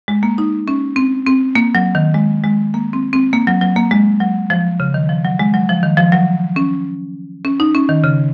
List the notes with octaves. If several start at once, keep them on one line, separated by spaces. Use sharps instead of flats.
G#3
A#3
D#4
C#4
C4
C4
A#3
F#3
D#3
G#3
G#3
A#3
C4
C4
A#3
F#3
F#3
A#3
G#3
F#3
F3
C#3
D#3
F3
F#3
G#3
F#3
F3
D#3
F3
F#3
C#4
C#4
D#4
C#4
D#3
C#3